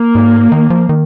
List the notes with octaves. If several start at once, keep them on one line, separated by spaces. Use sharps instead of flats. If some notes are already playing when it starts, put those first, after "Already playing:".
Already playing: A#3
G#2
D#3
F3
D#3